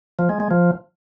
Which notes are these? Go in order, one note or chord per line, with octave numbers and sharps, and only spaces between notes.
F3
G#3
G#3
F3